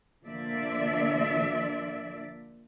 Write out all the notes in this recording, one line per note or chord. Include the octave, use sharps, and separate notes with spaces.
D3 F3 A#3 D4 D5 E5